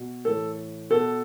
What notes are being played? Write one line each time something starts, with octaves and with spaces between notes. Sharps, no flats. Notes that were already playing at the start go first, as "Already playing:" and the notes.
Already playing: B2
A2 E3 A4
B2 A4